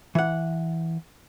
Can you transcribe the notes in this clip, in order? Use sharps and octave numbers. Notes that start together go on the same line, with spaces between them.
E3 F#5